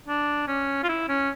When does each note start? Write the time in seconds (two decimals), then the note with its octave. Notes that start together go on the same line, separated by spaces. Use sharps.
0.08 D4
0.48 C#4
0.84 F4
0.89 E4
1.09 C#4